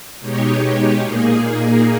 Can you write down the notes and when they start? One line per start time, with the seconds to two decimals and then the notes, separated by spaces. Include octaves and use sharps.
0.20 B2 G#3 D#4 G4 C#5
0.99 A#2 A#3 D#4 G#4